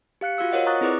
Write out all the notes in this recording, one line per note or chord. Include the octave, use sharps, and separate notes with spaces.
G4 F5 F#6 C#7
F4 F#4 F5 E6
F4 A#4 C5 C#5 D#5 F#5
A#5 C#6 D#6 F#6 A6
C4 E4 G#4 B4 D5 D6